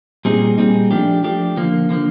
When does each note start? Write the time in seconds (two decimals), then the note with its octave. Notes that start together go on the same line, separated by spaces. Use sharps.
0.25 A#2 G3 C4 D#4 G#4
0.58 A#2 G3 C4 D#4 G#4
0.91 F3 A3 D4 G4
1.24 F3 A3 D4 G4
1.57 D3 F3 A#3
1.90 D3 F3 A#3